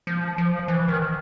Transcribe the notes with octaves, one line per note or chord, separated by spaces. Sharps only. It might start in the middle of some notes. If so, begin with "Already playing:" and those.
F3
F3
E3
D#3